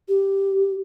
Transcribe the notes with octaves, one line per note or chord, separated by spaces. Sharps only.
G4